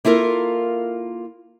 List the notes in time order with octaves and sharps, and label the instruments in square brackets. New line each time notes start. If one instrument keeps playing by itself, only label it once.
[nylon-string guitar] A#3 E4 F4 A4 A#4